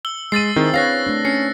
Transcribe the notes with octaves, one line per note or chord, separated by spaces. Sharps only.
E6 G7
G#3 E6 A6 C7 D#7
D#3 C4 E4 G#4
D4 B4 C#5 F5 F#6 A#6 C7
A3 D4
C#4 C7 C#7